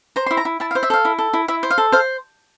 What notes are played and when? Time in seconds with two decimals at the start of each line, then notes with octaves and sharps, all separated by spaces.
0.16 C5 A#5
0.27 E4 C6
0.37 A#5
0.45 E4
0.60 E4 A5
0.71 F5
0.75 C5
0.83 E5
0.90 A4 F5
1.05 E4
1.19 A4
1.33 E4
1.48 E4 E5
1.63 C5
1.70 F5
1.78 A4
1.92 C5 F5